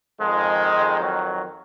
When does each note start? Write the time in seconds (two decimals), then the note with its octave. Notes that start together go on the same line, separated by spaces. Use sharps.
0.20 F2 D#3 F3 G#3
1.00 F#3